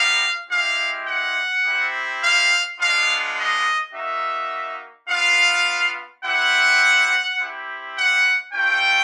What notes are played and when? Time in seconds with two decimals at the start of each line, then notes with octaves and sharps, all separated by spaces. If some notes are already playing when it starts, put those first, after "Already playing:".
Already playing: B3 D#4 G4 F5
0.50 G#3 C4 E4 G4 F5
1.07 F#5
1.64 C4 E4 G4
2.22 F5
2.79 G#3 B3 D4 F4 F5
3.37 D#5
3.94 A#3 D#4 F#4 E5
5.09 B3 D4 F4 F5
6.24 C4 E4 G4 F#5
7.39 C4 E4 G4
7.96 F#5
8.53 A3 C#4 F4 G5